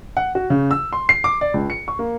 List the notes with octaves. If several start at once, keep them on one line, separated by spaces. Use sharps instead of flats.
F#5
F#4
C#3
E6
C6
C7
D6
D5
C#2
C#7
C#6
A#3